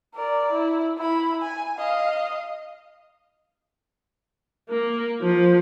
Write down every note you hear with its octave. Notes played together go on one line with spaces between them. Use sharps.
A#4 D5
E4
E4 B5
G#5
D#5 F5
A#3
F3